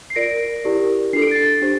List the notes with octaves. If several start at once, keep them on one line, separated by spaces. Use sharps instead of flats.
C7
F4 A#4 D5 A#6 D7
E4 G4 A#4 D5
D4 F4 A4 C7
D7
A6 C7
D4 G4 C5